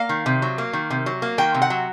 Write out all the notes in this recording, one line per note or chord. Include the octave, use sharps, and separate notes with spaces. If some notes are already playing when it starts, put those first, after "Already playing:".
Already playing: A#3 F5
D#3
C3
F#3
A#3
D#3
C3
F#3
A#3
D#3 G5
C3
F#5
F#3